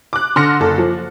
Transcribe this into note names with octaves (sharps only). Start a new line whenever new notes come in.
D6 F#6
D3 C6 F6 A#6 C#7
F#1 A4
F3